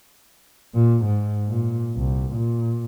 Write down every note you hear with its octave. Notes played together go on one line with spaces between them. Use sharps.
A#2
G#2
A#2
C2
A#2